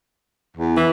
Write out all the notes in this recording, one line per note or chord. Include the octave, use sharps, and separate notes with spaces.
E2
E3